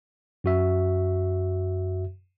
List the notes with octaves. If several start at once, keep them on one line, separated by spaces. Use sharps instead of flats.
F#2 F#4 E5